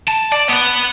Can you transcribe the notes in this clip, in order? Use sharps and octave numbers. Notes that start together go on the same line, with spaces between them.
A5
D5
B3 F#5